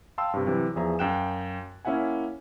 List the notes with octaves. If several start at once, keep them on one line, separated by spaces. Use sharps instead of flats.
F5 G5 A5 C6 E6
G2 C3
C3 E3 F#3
E2 F3 G#4 E5 A#5
F#2 F5 G5 F#6 E7
A#3 C#4 E4 E5 F#5 G#5